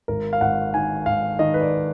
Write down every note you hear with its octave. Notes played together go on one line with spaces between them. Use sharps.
G#1 A#4
F5
G#1 F#5
D#3 G#5
G#1 F5
D#3 D#5
B4
D5